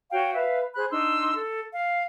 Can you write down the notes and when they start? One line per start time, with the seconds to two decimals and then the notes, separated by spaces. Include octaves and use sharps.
0.12 F#4 C#5 F5 G5
0.35 B4 E5 F5
0.75 G#4 C5 B5 F#6
0.91 D4 D#4 C6 E6
1.34 A4
1.73 F5